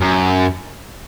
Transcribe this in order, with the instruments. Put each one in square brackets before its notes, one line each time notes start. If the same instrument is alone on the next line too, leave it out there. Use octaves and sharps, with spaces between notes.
[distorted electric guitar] F#2